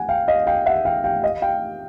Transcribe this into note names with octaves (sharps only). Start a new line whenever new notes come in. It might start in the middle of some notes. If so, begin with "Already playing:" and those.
Already playing: F#5 G#5
F5 G5
D#5 F5
F5 G5
E5 F#5
F5 G5
F5 G5
D#5 F5
F5 G5